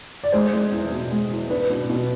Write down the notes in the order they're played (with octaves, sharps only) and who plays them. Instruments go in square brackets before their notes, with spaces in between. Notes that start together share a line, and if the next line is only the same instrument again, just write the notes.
[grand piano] D5
[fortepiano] G#3 [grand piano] C5
[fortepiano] G#3
E2
B2
G#3
E2
[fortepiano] D4 [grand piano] B4
[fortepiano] B2
B2